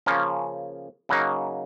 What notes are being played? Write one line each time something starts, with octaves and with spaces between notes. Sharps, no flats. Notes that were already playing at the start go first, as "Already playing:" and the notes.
C#3 F3 A#3 C#4
C#3 F#3 A#3 D#4